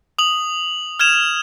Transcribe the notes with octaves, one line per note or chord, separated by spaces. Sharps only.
D#6 F#7
F6 G#6 E7 F7